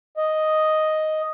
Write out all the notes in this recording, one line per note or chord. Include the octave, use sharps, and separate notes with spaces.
D#5